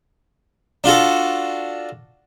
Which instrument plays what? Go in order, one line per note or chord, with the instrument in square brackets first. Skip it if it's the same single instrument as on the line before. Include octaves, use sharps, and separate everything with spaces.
[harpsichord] D4 F4 F#4 A4